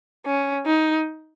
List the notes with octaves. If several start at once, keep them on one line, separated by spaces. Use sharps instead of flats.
C#4
D#4